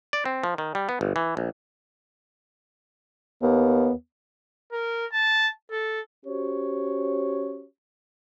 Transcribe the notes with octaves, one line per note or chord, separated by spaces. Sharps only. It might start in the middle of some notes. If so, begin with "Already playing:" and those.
D5
C4
F3
D#3
G3
B3
G1
E3
A#1
D#2 B3
A#4
A5
A4
C#4 F#4 G4 C5 C#5